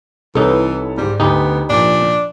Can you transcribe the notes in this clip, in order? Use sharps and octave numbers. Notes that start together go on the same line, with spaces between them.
C2 E3 D#4 A4 B4 C#5
G#2 G3
D2 B3 D#4 G4 B4
A#2 F3 D4